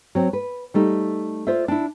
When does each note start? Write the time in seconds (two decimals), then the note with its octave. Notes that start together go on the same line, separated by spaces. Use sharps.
0.15 F#3 C4
0.33 B4
0.74 G3 A3 D#4
1.47 F4 C5 D5 E5
1.68 D4 E4